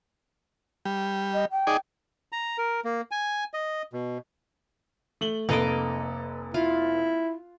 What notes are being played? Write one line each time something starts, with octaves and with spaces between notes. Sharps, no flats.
G3
D#5
G5
D#4 G#4 D5
A#5
A#4
A#3
G#5
D#5
B2
A3 F#7 G7
F1 A#3 A4 B4 D#5 D6
E4 F4